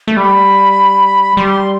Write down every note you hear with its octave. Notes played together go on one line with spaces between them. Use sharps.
A3
G3 B5
G3 C6